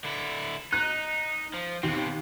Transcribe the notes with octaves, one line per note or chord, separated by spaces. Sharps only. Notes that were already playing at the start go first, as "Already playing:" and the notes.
D3 E4
D#4 F#6
F3
D#2 B2 C4